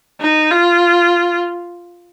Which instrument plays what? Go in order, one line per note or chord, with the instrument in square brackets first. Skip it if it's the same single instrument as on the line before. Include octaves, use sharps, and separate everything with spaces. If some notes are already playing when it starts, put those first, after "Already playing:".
[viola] D#4
F4